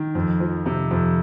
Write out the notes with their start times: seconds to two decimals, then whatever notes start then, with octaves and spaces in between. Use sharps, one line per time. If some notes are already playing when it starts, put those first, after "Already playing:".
Already playing: D#3
0.15 F2
0.40 F3
0.66 C3
0.91 F2